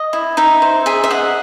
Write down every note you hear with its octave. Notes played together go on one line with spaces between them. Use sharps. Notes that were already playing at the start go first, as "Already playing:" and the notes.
Already playing: D#5
E4
D#4 E5
C5
G#4 E5
E5
D#5 F#5